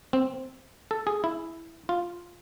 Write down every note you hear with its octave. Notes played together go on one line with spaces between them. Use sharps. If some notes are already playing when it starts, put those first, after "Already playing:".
C4
A4
G#4
E4
F4